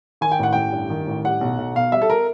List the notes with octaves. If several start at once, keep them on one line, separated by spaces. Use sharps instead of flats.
D#3 G#5
G5
A1 F#5
A1 G5
G2
D#3
A1
G3 F#5
B1
B1
B2 F5
G3 E5
A4
A#4